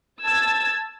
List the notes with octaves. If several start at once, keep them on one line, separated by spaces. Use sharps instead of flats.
A5 E6 G#6 A6